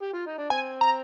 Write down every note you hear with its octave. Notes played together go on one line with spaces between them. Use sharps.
G4
F4
D#4
D4
C4 G#5
A#5